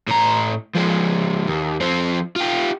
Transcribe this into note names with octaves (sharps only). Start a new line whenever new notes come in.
A2 A#5
F3 G#3
D#2
F3 C4
F4 G4